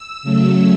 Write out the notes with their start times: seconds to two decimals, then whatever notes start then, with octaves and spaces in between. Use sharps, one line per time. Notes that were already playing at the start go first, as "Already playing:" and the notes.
Already playing: E6
0.23 C#3 F#3 A3